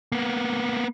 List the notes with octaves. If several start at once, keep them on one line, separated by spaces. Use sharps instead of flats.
A#3 B3